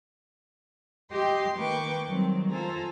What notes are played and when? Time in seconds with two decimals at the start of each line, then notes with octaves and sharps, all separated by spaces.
1.12 G4 D#5 G5 C6
1.57 D#3 A#3 B4 G5 C#6 D6
2.08 D#3 F#3 G3 C4
2.50 F4 A4 C5 G#5 A#5